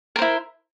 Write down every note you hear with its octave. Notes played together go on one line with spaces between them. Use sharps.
E4 A#4 C5